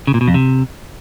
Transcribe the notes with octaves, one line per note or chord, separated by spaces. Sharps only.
C#3
A#2
B2
F2
C3